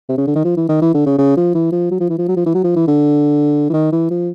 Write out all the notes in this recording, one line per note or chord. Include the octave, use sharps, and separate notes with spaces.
C3
C#3
D3
D#3
F3
E3
D#3
E3
D3
C#3
C#3
F3
E3
F3
F#3
F3
E3
F3
F#3
F3
E3
F#3
F3
E3
D3
E3
D#3
E3
F3